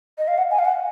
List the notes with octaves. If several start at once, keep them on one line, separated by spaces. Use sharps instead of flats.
D#5
F5
F#5
G#5
F5
F#5